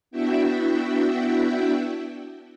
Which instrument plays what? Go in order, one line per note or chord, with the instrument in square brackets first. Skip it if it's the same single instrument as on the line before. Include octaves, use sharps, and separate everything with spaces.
[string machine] B3 D4 E4 F#4 E5 G5